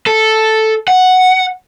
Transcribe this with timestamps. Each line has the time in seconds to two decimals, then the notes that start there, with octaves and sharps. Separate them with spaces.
0.07 A4
0.88 F#5